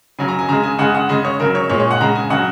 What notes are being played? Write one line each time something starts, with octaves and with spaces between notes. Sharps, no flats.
C#3 F#3 G#5
A#5
G#5
C#3 G#3 A#5
G#5
C#3 G#3 F#5
F#5
C#3 G#3 D#5
C#5
C#3 F#3 A#4
C#5
A#2 G#3 C#5
C#5
F#5
C#3 G#3 A#5
G#5
C#3 F#3 F#5